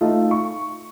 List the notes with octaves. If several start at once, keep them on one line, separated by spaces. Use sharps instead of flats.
A3 D#4 F4
C#6